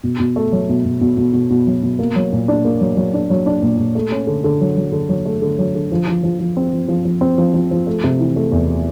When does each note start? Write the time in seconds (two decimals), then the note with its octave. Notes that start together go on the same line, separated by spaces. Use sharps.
0.04 B2
0.20 B2
0.36 A3
0.52 F#3
0.69 B2
0.85 B2
1.01 B2
1.17 B2
1.33 B2
1.50 B2
1.67 F#3
1.83 B2
1.99 A#3
2.16 F#3
2.32 A#2
2.48 D4
2.65 A#3
2.81 F#3
2.97 F#3
3.14 D4
3.30 F#3
3.46 D4
3.62 A#2
3.78 A#2
3.95 A3
4.12 C#4
4.27 D3
4.44 D3
4.61 F#3
4.77 F#3
4.92 D3
5.09 F#3
5.25 A3
5.42 D3
5.58 F#3
5.75 D3
5.92 F3
6.08 F3
6.23 F3
6.39 F3
6.57 C4
6.73 F3
6.88 F3
7.05 F3
7.21 C4
7.38 F3
7.54 F3
7.71 F3
7.87 A3
8.04 C3
8.19 E3
8.36 A3
8.52 E2